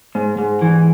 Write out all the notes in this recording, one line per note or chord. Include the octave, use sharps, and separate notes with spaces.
G#2
G#2
E3